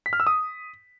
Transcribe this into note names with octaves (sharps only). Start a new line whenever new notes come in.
B6
F6
E6
D#6